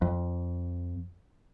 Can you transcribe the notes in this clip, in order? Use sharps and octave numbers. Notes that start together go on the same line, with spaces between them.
F2